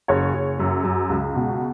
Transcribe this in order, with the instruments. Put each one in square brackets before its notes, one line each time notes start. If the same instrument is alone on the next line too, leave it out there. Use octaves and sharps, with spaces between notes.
[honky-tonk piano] F#1 G#4 C#5
F#1
F#2
F#2
C#2
B2